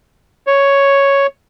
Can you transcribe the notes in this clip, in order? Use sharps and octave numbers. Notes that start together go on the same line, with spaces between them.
C#5